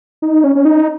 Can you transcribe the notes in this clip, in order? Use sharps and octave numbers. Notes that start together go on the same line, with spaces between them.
D#4
C#4
C#4
D#4